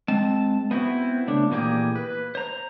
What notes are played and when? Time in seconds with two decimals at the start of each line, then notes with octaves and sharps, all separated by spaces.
0.08 G#3 C4 A5
0.71 B3 C4 E4 F#4
1.27 C#3 A3 D4
1.51 A#2 E3 A#3 C#4 G4 G#4
1.95 B4
2.35 C5 A#5